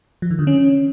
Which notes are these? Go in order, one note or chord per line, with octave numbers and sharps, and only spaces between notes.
F3
D#3
D3
C#4